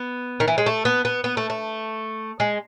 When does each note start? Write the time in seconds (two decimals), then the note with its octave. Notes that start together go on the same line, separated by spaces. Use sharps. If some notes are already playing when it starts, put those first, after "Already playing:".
Already playing: B3
0.40 D#3
0.48 E3
0.58 G#3
0.66 A3
0.85 B3
1.05 B3
1.24 B3
1.37 A3
1.50 A3
2.40 G#3